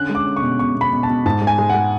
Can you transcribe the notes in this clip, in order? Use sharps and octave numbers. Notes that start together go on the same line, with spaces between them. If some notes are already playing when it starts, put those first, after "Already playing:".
Already playing: D3 C#4 F#6
G#3
D6
C#4
C#6
B2
B2 C#6
B2
B5
B2
A5
B2
G#2 A5
G#3
G#5
G#3
G#3 F#5